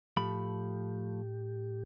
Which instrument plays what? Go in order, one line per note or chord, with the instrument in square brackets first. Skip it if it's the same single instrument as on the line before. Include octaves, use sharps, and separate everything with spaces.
[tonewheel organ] A2 G4 [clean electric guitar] F3 A3 B5